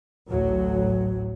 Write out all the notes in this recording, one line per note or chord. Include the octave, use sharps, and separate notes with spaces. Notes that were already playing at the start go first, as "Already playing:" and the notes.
A1 D2 A2 F#3